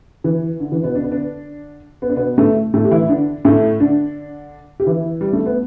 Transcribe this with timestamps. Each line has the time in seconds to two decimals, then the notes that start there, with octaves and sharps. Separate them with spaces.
0.24 E3
0.60 D3
0.72 E3
0.83 B2 B3
0.95 D4
1.04 B3
1.12 D3 D4
2.02 B3
2.09 D4
2.16 B2 B3
2.38 A2 A3
2.74 A2 A3
2.84 G4
2.91 E3 E4
3.09 D3 D4
3.45 A2 A3
3.80 D3 D4
4.80 G4
4.87 E3 E4
5.21 G3
5.33 A3
5.46 B3